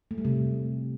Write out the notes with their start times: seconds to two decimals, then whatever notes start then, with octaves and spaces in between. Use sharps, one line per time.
0.11 A3
0.18 G3
0.25 C3